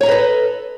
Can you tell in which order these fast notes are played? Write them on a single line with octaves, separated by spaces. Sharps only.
C#5 A#5 D#5 B4 A4